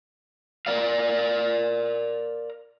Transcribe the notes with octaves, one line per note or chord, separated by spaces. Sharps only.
A#4 D5 F5